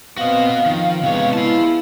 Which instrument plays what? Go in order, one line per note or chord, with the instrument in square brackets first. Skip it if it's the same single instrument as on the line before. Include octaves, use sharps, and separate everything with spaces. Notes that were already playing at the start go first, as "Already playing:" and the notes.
[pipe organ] B3 C4 [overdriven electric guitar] F#4 D#5 [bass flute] F5
[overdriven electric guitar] D#3 [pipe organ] F3
[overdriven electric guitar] C3 C#5 [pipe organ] G#3 B3
[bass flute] E4 [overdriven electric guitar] F5 A5